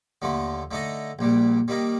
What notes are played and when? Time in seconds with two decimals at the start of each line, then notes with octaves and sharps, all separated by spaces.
0.22 D#2 D3 F3 A3
0.71 D3 A3 D#4 A4 D#5
1.19 A#1 A#2 G3
1.68 D#3 G3 A#3 D#4